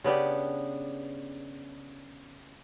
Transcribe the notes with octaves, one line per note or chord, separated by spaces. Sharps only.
C#3 B3 D4 G4